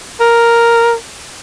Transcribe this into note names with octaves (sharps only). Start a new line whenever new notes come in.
A#4